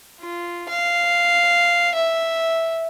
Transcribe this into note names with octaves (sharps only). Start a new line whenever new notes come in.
F4
F5
E5